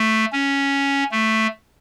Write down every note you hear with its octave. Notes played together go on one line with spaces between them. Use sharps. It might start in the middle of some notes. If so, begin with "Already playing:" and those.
Already playing: A3
C#4
A3